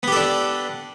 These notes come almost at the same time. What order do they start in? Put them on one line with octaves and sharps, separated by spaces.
B3 G4 A4 D4